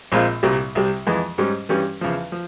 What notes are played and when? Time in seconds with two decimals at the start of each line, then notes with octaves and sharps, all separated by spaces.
0.12 A#1 A#2 G#3 C4 F4
0.43 C2 A#2 G3
0.75 C2 C3 G3
1.07 F2 E3 G#3
1.38 G#2 G3 C#4
1.69 G2 E3 G3 C#4
2.01 E2 C#3 F3
2.32 F3